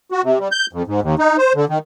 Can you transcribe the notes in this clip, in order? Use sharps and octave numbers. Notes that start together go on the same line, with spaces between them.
F#4
C3
G3
G6
F2
G#2
D#2
D#4
C5
D3
D#3